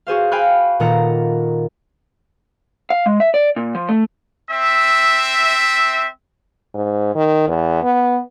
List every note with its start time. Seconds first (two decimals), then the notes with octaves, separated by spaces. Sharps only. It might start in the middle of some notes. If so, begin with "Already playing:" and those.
0.07 F#4 G#4 C5 F5
0.31 F5 G5 G#5 B5 F6 F#6
0.80 A#2 D#3 A#3 A4 F#5 A#5
2.90 F5
3.06 G#3
3.20 E5
3.34 D5
3.56 A#2
3.75 F3
3.89 A3
4.51 C4 E5
6.74 G#2
7.15 D#3
7.48 E2
7.82 B3